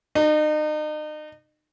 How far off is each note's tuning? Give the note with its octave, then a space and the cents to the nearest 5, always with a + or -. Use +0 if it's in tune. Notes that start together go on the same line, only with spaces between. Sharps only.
D#4 -35